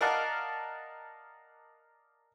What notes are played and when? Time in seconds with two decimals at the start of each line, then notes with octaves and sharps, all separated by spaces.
0.01 A#4 D5 D#5 F5 F#5 A5